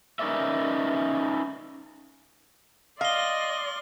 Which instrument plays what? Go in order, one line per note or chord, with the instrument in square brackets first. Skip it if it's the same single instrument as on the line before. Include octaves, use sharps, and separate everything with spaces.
[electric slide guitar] C#4 D#4 A#4 B4 D5 E5
[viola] D5 C6 [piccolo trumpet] D#5 [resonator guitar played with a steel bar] F5 [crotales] F6 G7